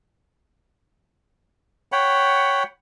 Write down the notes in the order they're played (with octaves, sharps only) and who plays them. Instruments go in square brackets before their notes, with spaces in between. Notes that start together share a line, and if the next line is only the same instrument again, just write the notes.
[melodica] C#5 F#5 G5 B5